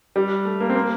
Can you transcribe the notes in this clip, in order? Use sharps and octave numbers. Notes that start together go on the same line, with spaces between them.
G3
A3
A#3
C4
A#3